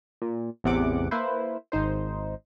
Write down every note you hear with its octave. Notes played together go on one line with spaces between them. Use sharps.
A#2
A1 E2 C3 F#5 D6
A#3 E4 B4 C5
G#1 D#4 C5